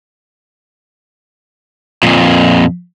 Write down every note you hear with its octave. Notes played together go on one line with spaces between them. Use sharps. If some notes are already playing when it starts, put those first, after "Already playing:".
F2 A#2